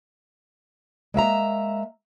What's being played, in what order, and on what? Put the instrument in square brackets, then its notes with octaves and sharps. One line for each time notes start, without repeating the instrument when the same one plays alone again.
[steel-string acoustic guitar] G#3 A#3 E5 A#5